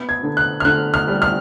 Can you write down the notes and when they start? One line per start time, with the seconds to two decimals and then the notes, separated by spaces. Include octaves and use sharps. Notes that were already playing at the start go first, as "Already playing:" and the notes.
Already playing: B3
0.09 G#6
0.23 D3
0.37 F#6
0.60 F6
0.65 D3 F#6
0.94 F6
1.08 G3
1.22 F6